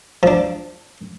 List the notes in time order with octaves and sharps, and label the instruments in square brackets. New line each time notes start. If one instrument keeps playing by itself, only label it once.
[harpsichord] F3 D4